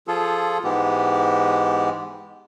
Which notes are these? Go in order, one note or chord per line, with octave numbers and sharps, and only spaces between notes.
F3 F4 G#4 A4
G#2 E3 G#3 B3 G4